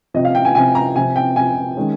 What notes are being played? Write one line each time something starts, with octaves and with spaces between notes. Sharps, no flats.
C3 F3 C4 D#5
F5
G5
G#5
C3 F3 C4 G#5
A#5
C3 F3 C4 G#5
G5
C3 F3 C4 G#5
D#3 G#3 C#4